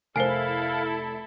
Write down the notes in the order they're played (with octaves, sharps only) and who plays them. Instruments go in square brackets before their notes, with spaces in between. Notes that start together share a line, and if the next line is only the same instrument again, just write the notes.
[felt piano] F1 A#4 C7 [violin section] E4 A4 [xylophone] C5 G#5 [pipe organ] F5